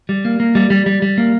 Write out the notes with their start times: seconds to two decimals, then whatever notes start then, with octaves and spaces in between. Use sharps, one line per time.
0.09 G3
0.25 A#3
0.40 A#3
0.55 G3
0.70 G3
0.86 G3
1.02 G3
1.18 A#3